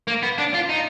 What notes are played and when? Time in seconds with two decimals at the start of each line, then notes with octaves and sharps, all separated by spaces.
0.08 A#3
0.23 B3
0.38 D4
0.54 F4
0.69 D#4